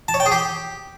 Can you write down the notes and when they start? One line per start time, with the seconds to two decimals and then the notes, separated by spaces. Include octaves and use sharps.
0.08 A5
0.14 C#5
0.20 G5
0.26 G#4
0.32 G4